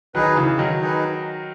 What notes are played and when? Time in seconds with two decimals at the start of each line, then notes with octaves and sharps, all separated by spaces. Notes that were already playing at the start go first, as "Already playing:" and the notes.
0.15 D#3 F#3 D#4 G#4 B4
0.37 C#3 E3
0.59 D#3 F#3
0.81 D#4 G#4 B4